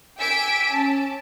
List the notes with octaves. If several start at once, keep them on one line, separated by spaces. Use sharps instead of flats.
G5 G#5 D6 E6 B6 D7
C#4 A5